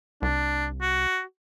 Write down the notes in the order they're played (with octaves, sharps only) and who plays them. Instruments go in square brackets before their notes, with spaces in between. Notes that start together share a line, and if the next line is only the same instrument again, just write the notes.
[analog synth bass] C2 [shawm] D4
[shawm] F#4